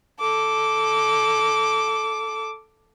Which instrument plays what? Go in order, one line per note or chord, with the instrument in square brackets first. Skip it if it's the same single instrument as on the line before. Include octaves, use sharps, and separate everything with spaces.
[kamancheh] A4 D6